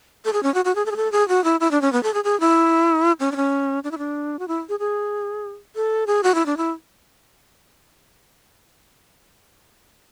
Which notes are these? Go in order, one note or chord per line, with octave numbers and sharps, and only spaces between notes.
A4
G#4
C#4
F#4
F#4
G#4
A4
G#4
A4
G#4
F#4
E4
E4
D4
C#4
B3
A4
G#4
G#4
E4
C#4
D4
C#4
D4
E4
D4
F#4
E4
G#4
G#4
A4
G#4
F#4
E4
D4
E4